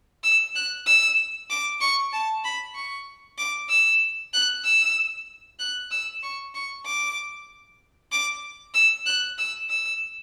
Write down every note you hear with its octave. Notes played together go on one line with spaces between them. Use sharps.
E6
F#6
E6
D6
C#6
A5
B5
C#6
D6
E6
F#6
E6
F#6
E6
C#6
C#6
D6
D6
E6
F#6
E6
E6